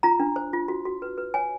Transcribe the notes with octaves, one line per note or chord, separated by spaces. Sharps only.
F4 A#5
D4
C5
F4
F#4
F#4
B4
B4
C#5 G#5